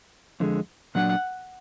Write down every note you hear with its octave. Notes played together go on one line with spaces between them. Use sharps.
F2 D3 G#3
A#2 F#3 D4 F#5